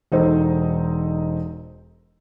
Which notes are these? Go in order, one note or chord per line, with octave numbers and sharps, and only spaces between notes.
E1 D#4 A4 C5